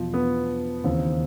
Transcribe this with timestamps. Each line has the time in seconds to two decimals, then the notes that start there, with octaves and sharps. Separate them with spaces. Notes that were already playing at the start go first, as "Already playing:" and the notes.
Already playing: E2 B2 F3
0.14 B3
0.84 D#2 C#3 E3 C4